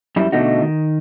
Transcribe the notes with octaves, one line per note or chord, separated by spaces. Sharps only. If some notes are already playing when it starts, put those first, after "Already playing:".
F#2 G3 E4
B2 D3 A3 D#4 F#4
D#3